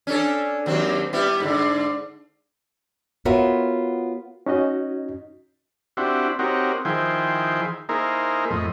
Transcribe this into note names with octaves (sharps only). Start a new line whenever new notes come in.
C#4 D4 A4
D#2 F#3 C4
G3 B3 E4
G#2 D3
B3 F4 F#4 A#4 C#5 E5
C#4 D#4 F#4 D#5
C4 D4 E4 F#4 G4
C4 D#4 F#4 G4 A#4 C#5
D#3 F3 E4 G#4 C5 G5
A#3 D#4 E4 G#4 A#4 C5
F2 A2 D#5